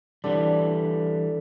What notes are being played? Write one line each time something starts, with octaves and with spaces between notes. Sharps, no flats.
D3 E3 G3